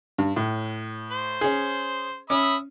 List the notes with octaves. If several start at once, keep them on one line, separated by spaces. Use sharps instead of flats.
G2
A2
C5
C#4 G#4
C#4 E5 B5 D#6